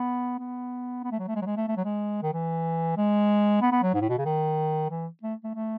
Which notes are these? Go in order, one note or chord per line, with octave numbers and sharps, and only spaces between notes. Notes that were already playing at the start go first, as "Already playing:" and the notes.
Already playing: B3
B3
B3
A3
F#3
A3
G#3
F#3
G#3
A3
A3
F#3
G#3
D#3
E3
G#3
B3
B3
F#3
G#2
A2
B2
C#3
D#3
E3
A3
A3
A3